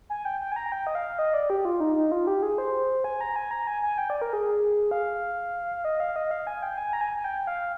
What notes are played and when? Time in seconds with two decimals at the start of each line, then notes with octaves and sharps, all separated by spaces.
0.10 G#5
0.25 G5
0.41 G5
0.52 G#5
0.56 A#5
0.72 G5
0.87 D#5
0.95 F5
1.19 D#5
1.34 D5
1.50 G4
1.65 F4
1.80 D#4
1.96 D#4
2.12 F4
2.27 G4
2.43 G#4
2.58 C5
3.04 G#5
3.21 A#5
3.36 G#5
3.51 A#5
3.67 G#5
3.83 G#5
3.98 G5
4.10 D5
4.22 A#4
4.33 G#4
4.91 F5
5.85 D#5
6.00 F5
6.16 D#5
6.31 F5
6.47 G#5
6.62 G5
6.77 G#5
6.93 A#5
7.01 G#5
7.17 G#5
7.24 G5
7.47 F5